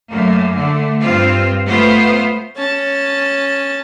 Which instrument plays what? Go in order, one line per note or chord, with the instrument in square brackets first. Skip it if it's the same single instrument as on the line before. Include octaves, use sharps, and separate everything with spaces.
[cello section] F#2 A3 A#3
D3 A3
G2 C4 F4
A3 B3 F4 C5
[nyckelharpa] C#4 A5